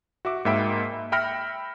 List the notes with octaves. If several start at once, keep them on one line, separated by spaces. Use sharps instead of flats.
F#4 E5 D6
G#2 A#3 E5 G5 B5 D7
E5
E5 G5 B5 F6 A#6 C#7